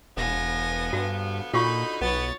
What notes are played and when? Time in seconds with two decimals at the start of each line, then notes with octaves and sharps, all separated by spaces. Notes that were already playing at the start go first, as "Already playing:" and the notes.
0.17 E1 D3 F3 B3 G#5 A#6
0.93 G2 F#4
1.54 A#2 D3 D#4 F4 F#4 B5 C#6
2.01 B1 B3 C#5 A6